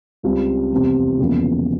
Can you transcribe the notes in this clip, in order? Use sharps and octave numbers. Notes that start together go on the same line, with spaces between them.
C#2 C#3 G3 C4
F1 E2 C3 G3
E1 E2 C#3 F3 A#3